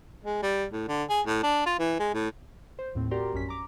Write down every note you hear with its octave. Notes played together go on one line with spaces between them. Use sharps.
G#3
G3
A2
D3
G#4
A2
D4
F4
E3
G#3
A2
C5
D#2 A2 C4
F#4 G4 A#4 D5 A#5 C6
A#1 F#2 C#4 B6
A#5 D6